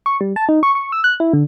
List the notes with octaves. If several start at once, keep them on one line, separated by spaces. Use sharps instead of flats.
C#6
G3
A5
D#4
C#6
C#6
E6
F#6
E4
D3